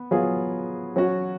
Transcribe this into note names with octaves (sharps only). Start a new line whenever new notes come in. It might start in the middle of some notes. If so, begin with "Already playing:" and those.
Already playing: B3
F#3 B3 F4 G#4
F#3 C#4 F#4